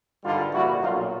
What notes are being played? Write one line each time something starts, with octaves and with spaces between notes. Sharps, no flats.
G#1 G2 D3 G3 D#4 F4
A#1 A#2 G3 E4 F#4
B1 A#2 F#3 D#4 F4